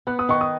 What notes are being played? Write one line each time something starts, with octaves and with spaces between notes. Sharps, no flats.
B3 F#6
D#6
D#3 C#6
D#6